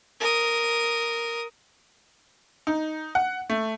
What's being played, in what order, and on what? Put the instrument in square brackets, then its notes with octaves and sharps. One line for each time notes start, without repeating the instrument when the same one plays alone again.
[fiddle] A#4 D#6
[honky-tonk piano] D#4
F#5
A3